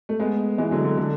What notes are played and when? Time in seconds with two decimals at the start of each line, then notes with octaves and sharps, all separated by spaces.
0.09 A3
0.19 G#3 B3
0.58 E3 G#3
0.71 D3 F#3
0.84 D3 F#3
0.97 D3